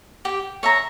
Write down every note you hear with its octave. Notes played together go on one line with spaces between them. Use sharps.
G4
C#5 E5 A#5